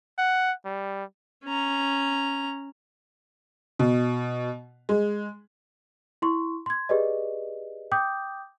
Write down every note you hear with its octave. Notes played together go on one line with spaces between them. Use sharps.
F#5
G3
C#4 A#5
B2
G#3
E4 C6 C#6
C6 G#6
G4 G#4 B4 D5 D#5
G5 D6 D#6 G6